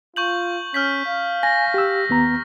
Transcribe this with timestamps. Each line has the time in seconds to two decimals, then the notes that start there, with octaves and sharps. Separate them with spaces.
0.16 F4 C#6 G6 F#7
0.74 C#4 F6 G6 B6
1.06 F5
1.43 G#5 A#6
1.74 G4 E6
2.09 D#2 B3 A#5